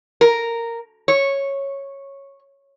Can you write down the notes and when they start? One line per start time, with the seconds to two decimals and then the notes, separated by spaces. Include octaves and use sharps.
0.21 A#4
1.08 C#5